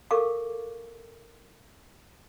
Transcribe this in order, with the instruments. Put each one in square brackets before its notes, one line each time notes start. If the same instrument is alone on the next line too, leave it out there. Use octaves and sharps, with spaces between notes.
[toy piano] A4 A#4 F5 C#6 D6